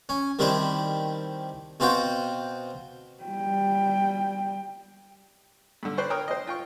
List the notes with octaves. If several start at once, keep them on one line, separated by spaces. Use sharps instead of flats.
C#4
D#3 G3 C4 D4 E4
B2 C4 F4 F#4 G5
G3 G5
G2 D3
B4 C5 D5 C#6
A#4 C#5 G5 A#5 D#6 F6
C5 D#5
F4 G5 C#6